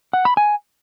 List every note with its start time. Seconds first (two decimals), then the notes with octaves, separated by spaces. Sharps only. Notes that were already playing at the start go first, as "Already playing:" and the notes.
0.13 F#5
0.25 B5
0.37 G#5